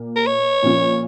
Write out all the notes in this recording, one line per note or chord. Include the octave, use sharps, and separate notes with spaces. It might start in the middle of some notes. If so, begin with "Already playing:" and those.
Already playing: A#2 A#3
A#4
C#5
A#2 F3 C#4 F4